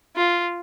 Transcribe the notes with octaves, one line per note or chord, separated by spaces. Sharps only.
F4